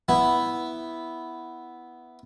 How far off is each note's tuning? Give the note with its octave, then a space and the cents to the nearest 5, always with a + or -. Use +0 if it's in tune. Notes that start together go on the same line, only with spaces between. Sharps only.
B3 +0 E4 +0